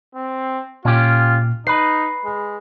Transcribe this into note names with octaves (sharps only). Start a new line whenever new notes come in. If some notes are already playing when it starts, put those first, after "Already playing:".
C4
A#2 C#4 F4 G4
D#4 B4 B5 C7
G#3